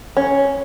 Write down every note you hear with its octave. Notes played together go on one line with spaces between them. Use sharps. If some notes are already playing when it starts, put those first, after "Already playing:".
C#4